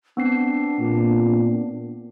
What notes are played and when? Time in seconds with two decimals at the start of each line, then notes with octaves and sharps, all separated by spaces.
0.17 B3 C4 D4 C7
0.79 A#2